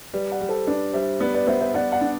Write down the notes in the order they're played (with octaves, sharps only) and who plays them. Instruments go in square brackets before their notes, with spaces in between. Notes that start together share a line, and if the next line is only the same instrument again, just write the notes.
[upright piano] G3 [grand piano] B4 D5
[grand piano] D5 F#5
[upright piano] G3
[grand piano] A4 C5
[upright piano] D4 [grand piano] B4 D5
[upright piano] G3 [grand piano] C5 E5
[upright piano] B3 [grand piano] B4 D5
[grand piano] B4 D5
[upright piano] B3 [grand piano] C5 E5
[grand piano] C5 E5
[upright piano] B3 [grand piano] D5 F#5
[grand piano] D5 F#5
[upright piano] D4